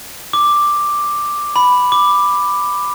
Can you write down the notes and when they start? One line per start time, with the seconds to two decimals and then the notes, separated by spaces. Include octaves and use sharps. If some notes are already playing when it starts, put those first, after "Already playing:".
0.33 D6
1.56 B5
1.92 D6